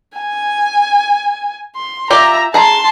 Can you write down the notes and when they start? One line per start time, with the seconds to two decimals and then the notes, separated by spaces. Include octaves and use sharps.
0.18 G#5
1.75 C6
2.10 F4 G4 D5 E5 A#5
2.54 G#4 A5 A#5 C6